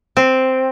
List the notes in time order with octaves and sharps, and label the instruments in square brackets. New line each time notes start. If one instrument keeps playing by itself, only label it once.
[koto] C4